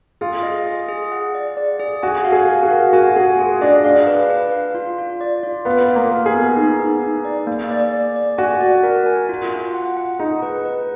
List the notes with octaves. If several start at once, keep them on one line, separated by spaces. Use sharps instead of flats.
F4 G#4
D#5
G#4
G#4
F#5
D5
D5
G#4
F#4 G#5
F5
G#4
F5
F#4
A#4
F#4 G#5
G#4 G#5
F4 G#4
D4 D#5
D4 F5
B4
B4
F5
F4
F4
D5
F4
B3 F5
F4
A#3
A#4
G#4
B3
D#4
D#4
D#4
D5
A#3
D5
D5
D5
F#4 G#5
D5
A#4
G#5
F4
F4
F#5
F#5
D#4 G#4
B4
B4